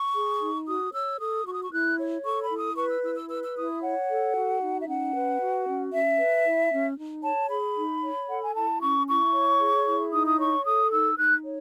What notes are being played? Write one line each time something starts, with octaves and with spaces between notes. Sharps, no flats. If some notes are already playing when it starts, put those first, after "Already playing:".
Already playing: C#6
G#4
D#4
F#4 D#6
C#5 E6
A4 D#6
F#4 C#6
D#6
C#6
E4 F#6
C#5
A4 C#6
B5
E4
D#6
B4 C#6
E6
E4 E6
E6
B4 E6
E6
E4 D#6
C#5 F#5
A4
F#4
D#4
E5
C#4 F#5
B4
F#4
C#4
C#4 E5
B4
E4
C#4
D#4
C#5 A5
G#4 B5
D#4
C#5
A4 F#5
G#5
E4 A5
C#4 C#6
E4 C#6
C#5
G#4
E4
D#4 D#6
D#6
C#5 C#6
A4 D#6
D#4 E6
D#4 F#6
C#5